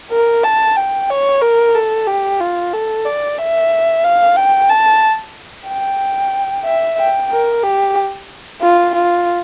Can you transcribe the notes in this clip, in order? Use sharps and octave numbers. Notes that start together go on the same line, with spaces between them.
A#4
A5
G5
C#5
A#4
A4
G4
F4
A4
D5
E5
F5
G5
A5
G5
E5
G5
A#4
G4
F4
F4